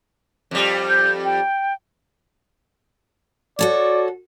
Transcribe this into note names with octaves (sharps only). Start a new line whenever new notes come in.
F2 G3
G6
G5
F#4 A4 C#5 D5